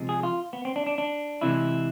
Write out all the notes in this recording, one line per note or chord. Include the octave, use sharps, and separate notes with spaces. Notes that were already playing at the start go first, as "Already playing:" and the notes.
Already playing: C3 F3 G#3
G#4
F4
B3
C4
D4
D4
D4
C3 E3 G#3 E4